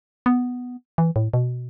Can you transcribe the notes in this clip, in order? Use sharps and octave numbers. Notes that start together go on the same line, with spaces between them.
B3
E3
A2
B2